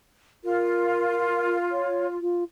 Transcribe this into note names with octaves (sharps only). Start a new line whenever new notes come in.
F4 A#4
C#5
F4